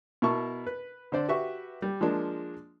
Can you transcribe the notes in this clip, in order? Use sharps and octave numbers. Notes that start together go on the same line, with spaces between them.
B2 E4 A#4 A5 C#6
B4
D3 D4 C5 D5
F#4 G4 B4 E5 C#6
G3
F3 G#3 A#3 D4